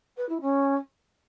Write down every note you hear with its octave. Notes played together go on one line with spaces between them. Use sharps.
B4
E4
C#4